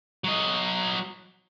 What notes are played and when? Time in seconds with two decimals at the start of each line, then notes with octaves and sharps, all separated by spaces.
0.24 F#3 D#5